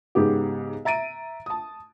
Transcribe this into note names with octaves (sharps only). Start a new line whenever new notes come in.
G#2 C#3 B3 G4
E5 A#5 A6 D7 D#7
A5 D#6